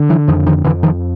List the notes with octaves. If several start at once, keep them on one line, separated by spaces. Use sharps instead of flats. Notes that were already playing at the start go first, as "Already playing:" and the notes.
Already playing: D3
E3 F#3
F2 D#3 F3
D#3 F3
F2 D3 E3
D#3 F3